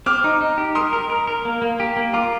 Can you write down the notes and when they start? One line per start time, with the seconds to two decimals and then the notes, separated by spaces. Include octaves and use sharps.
0.06 C4 D6 F6
0.24 D#4
0.41 D#4
0.58 G4
0.75 A#4 C6 D#6
0.93 A#4
1.10 A#4
1.27 A#4
1.45 A#3
1.62 A#3
1.80 G4
1.96 A#3
2.13 F4 A#5 D6